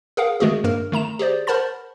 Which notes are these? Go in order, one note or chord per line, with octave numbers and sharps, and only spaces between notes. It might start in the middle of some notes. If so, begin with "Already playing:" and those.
G#4 A#4 F5 F#5
D#3 G#3 A3 F#4 G#4
G2 A#3 A#4
D#3 A3 A#5 E7
G4 G#4 C5 D5
A#4 C5 F#5 A5 B5 A6